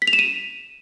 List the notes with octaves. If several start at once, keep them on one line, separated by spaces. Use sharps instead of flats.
B6
F7
E7
D#7